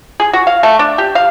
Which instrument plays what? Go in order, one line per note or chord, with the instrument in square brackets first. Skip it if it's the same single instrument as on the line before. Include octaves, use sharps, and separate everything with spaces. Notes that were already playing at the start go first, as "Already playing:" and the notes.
[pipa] G#4
F#4
F5
A3
D4
G4
F5